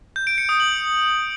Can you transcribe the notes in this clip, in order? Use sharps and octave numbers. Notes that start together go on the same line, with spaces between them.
G6
D7
C#7
D#6
F#7